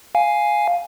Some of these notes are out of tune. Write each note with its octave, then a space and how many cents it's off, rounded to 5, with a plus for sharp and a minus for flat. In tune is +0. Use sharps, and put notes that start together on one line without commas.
F5 +0 G#5 +0